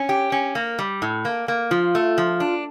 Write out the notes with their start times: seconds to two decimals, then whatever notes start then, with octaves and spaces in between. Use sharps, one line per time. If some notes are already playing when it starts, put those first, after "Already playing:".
Already playing: C#4
0.09 G4
0.32 C#4
0.55 A#3
0.79 G3
1.02 A2
1.25 A#3
1.48 A#3
1.71 F3 F4
1.95 A3
2.18 F3
2.40 D4